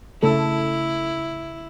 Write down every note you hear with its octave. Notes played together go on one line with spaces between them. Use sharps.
C#3 A3 E4 A4